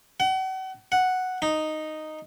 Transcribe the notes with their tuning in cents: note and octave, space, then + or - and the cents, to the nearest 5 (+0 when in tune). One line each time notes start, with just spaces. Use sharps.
F#5 +40
F#5 +0
D#4 -5